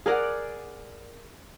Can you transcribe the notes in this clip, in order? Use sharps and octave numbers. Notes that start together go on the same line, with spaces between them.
G#4 A#4 D5 F#5